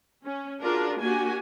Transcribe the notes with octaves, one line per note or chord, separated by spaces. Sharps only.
C#4
D4 F4 F#4 G#4 A#4
A#3 D4 F#4 G4 G#5